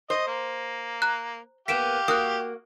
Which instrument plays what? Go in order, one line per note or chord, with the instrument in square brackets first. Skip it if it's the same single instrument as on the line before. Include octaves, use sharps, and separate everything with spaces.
[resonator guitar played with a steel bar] C5 [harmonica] D#5
[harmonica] A#3
[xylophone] A#5 F#6
[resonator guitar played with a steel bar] A#3 B3 [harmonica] G4 F5 [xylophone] B6 D7 E7
[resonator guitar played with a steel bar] A#3 F#4 [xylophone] D#6 F#6